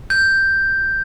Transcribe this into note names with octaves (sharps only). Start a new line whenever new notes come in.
G6